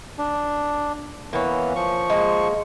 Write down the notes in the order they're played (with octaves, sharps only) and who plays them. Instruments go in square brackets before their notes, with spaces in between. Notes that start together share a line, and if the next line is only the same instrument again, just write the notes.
[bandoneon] D4
[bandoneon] E3 B3 [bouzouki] A#3 C#4
[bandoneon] F3 C#6
[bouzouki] G#3 A#3